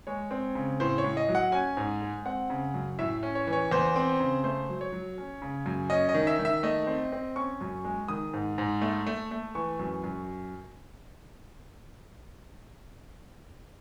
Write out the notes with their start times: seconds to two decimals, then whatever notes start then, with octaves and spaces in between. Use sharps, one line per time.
0.07 G#3 C#5
0.31 C4
0.55 C#3
0.80 A2 C5
0.98 C#5
1.04 A2
1.17 D#5
1.29 F#3
1.35 F#5
1.52 C#4 G#5
1.77 G#2
2.02 G#3
2.25 C4 F#5
2.50 C#3
2.74 F#2
2.99 A2 E5
3.23 C#4
3.35 C#5
3.47 E3
3.53 C#5
3.72 E2 C5
3.96 C4
4.20 C#3
4.44 A3 C5
4.69 F#3
4.81 C#5
4.92 F#3
5.18 C#4
5.42 C#3
5.66 F#2
5.90 C#4 D#5
6.09 D#5
6.14 D#3
6.27 E5
6.39 D#3
6.45 E5
6.63 A3 D#5
6.87 C4
7.12 C4
7.36 C#4 C#6
7.61 F#2
7.85 G#3
8.08 D#3 D#6
8.33 G#2
8.58 G#2
8.82 A3
9.07 A3
9.31 A3
9.55 E3 C#6
9.79 F#2
10.04 F#2